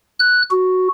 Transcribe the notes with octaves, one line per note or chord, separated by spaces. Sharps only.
F#6
F#4